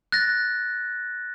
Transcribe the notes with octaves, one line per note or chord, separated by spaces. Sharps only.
F#6 A6 A#6